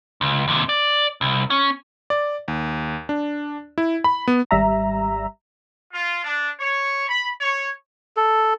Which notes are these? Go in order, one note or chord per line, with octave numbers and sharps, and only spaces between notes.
C#2
D#2 C3
D5
C2
C#4
D5
D#2
D4
E4
B5
B3
G#1 G3 E5 A#5
F4
D4
C#5
B5
C#5
A4